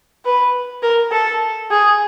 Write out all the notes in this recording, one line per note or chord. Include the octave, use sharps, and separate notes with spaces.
B4
A#4
A4
G#4